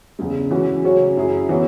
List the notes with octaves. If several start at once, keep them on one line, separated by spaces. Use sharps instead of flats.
E2 C#3 G#3
E3 C#4 F#4
C#3 F#3 C#4 F#4 C#5
F#2 F#3 E4 G#4
E3 B3 F#4 C#5